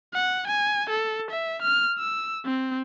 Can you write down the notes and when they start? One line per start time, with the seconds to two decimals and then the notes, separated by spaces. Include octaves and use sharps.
0.14 F#5
0.47 G#5
0.90 A4
1.31 E5
1.62 F6
1.99 E6
2.45 C4